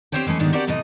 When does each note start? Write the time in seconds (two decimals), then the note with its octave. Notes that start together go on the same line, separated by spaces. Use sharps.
0.12 D3 C4 G4 C5 C#5 G5
0.26 E3 G#3 A3 C#4
0.39 G#2 D3 D#3 G3 B3 D4
0.53 C4 F#4 G4 A#4 D5 F#5
0.67 A2 C3 E3 A3 D#5